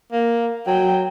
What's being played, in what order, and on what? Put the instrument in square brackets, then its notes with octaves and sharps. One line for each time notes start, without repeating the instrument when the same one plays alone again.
[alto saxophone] A#3
[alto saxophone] F#3 [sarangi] G5